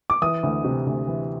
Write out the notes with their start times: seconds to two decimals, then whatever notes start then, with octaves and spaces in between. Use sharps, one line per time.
0.10 D6
0.22 E3 D#6
0.43 D2
0.64 C3
0.86 D2
1.08 E3